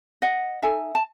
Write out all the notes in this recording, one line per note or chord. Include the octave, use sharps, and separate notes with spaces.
D#5 F#5
D#4 A4 E5 G#5
A5